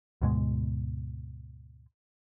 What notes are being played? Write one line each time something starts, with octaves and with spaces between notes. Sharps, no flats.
D2 G#2 B2 G#3